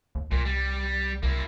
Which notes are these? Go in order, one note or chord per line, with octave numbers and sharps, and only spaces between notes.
D#2
C2 A#2
G3
C2 A#3 E4